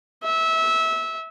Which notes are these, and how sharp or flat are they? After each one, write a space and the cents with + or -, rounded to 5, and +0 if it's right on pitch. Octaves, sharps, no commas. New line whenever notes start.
E5 -20